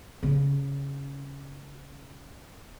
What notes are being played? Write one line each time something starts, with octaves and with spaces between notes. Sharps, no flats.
C#3 C#4